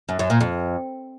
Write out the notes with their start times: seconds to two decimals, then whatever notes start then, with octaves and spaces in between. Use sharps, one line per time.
0.09 F#2
0.19 F#2
0.30 A#2
0.41 F2